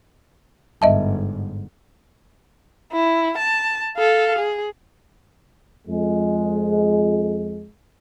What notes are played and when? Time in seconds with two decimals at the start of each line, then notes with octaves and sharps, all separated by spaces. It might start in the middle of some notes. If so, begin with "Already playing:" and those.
0.82 G1 G#2 D#5 E5 A5
2.93 E4
3.38 A5
3.97 A4 F5
4.38 G#4
5.88 F2 G#3